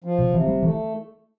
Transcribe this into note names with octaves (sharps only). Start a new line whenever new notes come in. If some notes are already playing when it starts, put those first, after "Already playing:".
F3
C3
C3 E3
G3
E3 A3